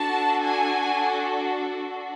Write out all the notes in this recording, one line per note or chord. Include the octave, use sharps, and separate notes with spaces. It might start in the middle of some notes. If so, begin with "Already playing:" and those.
Already playing: D4 F#4 A4 A5
G#5